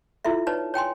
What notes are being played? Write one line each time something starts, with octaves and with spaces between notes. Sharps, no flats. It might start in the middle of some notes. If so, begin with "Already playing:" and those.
E4 F4 A4 E5
D#4 B4 C#5 D5 A5
C#5 G5 G#5 C6